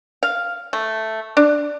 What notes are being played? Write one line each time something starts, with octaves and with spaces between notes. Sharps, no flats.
F5
A3
D4